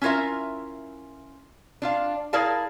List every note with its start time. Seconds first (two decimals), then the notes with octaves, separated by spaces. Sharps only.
0.02 C#4 E4 F4 A#4 E5
1.82 D4 F4 F5
2.33 E4 G#4 A#4 D5 F5 A5